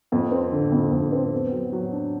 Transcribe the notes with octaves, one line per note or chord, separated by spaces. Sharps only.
F2
C4
D3
F2
F2
C4
B3
F#3
F#3
D4